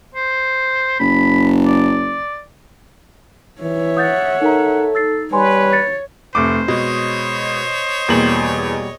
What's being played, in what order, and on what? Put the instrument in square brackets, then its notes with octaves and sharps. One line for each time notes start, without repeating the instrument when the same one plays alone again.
[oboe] C5
[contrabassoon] F#1 [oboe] B5
[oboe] D5
[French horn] E3 [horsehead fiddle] C#5 E5
[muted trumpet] F#5 [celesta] D#6 G6 A6
[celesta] D#4 A#4 A#5 [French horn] A4
[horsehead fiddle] D#4 [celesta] E6 A6 C7
[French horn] G3 [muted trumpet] B4 [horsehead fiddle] C#5 [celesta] G#5 C6
[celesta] A6 C#7
[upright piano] F1 A3 D6 [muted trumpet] C5
[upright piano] B2 [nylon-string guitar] G#3 [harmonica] C#5 D#5
[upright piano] E2 F#7 [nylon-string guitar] B2 G3 A#3